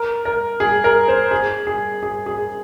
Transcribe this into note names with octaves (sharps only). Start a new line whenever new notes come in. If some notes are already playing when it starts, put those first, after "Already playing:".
Already playing: A#4
A#4
G#4
A#4
C5
G#4
G#4
G#4
G#4